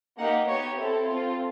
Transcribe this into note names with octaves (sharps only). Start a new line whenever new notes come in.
A#3 D#4 G4 F#5
B3 D#4 G4 C#5
C4 E4 A4
C4 F4 A4